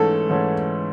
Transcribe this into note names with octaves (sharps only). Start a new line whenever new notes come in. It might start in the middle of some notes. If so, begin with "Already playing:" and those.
Already playing: G#2 E3 A3 C#4 A4
G#2 E3 A3 C#4